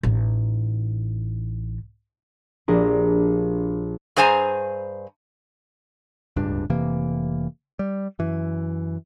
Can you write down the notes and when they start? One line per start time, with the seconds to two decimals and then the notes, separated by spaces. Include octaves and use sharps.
0.03 A1 D#4
2.68 A#1 D4 G4 G#4 A#5
4.16 G2 G#4 C5 G#5 A#5
6.36 D1 C#2 G2 D4
6.70 F1 C3 E3 A#3
7.79 G3
8.19 F#2 E3